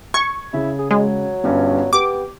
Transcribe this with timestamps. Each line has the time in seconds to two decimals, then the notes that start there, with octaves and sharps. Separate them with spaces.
0.14 C#6 G#6
0.53 C#3 E4
0.79 G#4
0.91 F#3 G#3
1.44 G1 G2 C#4
1.93 B3 G4 D6